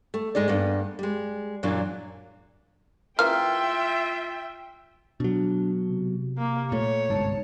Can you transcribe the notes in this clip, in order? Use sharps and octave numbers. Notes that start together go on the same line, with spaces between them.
A3
G#2 G#3 D#4 D5
G2 A#3 B3
G3 G#3
F#2 A#2 E3 F#3 D4
C#3 E3 A#3 F4 E5 G5 F6
B2 F#3 D4
C3
A#3
A#2 A3 C#5
G1 C2 G#2 A5